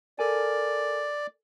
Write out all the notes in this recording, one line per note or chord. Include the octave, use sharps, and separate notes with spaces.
A4 A#4 D5 G#5